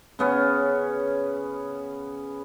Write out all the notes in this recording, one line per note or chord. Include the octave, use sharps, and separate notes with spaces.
C#3 B3 C#4